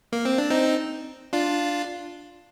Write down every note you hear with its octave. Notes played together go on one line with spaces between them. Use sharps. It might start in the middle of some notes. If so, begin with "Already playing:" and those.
A#3
C4
D4
C4 D#4
D4 F4